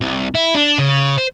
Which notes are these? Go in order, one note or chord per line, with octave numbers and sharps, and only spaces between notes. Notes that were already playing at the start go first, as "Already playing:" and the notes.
C2
E4
D4
C#3
C5